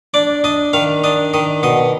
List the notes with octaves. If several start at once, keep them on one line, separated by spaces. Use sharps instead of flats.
D4 D5
D4 D#5
D#3 F5
D4 D#5
D#3 D#5
B2 D#5